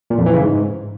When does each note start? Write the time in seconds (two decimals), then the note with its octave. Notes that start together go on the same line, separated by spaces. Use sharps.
0.10 A#2
0.18 F2
0.26 E3
0.34 C#3
0.42 G#2